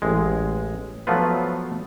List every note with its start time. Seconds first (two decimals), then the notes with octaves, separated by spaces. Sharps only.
0.02 A1 G#3
1.07 F3 F#3 A3 B3 F4 B4